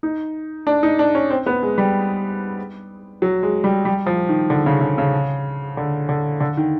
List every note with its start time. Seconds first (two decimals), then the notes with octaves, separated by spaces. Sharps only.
0.03 D#4
0.67 D4
0.83 D#4
0.99 D4
1.15 C#4
1.30 C4
1.46 B3
1.63 G#3
1.78 G3
3.22 F#3
3.43 G#3
3.64 G3
3.85 G3
4.06 F3
4.29 D#3
4.50 D3
4.66 C#3
4.81 C#3
4.98 C#3
5.77 D3
6.09 D3
6.40 D3
6.57 D#3